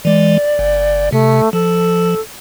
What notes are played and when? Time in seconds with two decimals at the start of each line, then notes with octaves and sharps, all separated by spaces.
0.05 E3 G#3 D5
0.59 G1
1.13 C3 A3
1.53 F3 A4